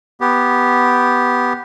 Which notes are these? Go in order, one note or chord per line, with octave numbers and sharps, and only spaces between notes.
B3 G4